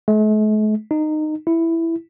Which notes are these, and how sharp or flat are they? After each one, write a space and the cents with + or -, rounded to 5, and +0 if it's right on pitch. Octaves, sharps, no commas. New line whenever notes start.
A3 -45
D#4 -20
E4 +5